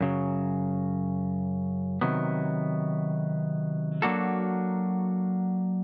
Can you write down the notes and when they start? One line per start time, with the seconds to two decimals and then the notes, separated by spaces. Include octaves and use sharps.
0.01 F#2 C#3 F#3
2.01 C3 D#3 F#3 B3
4.02 F#3 A#3 D4 F#4 A4